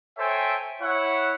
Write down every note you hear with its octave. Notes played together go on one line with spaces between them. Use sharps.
A4 C5 C#5 E5 G5 G#5
E4 C#5 F#5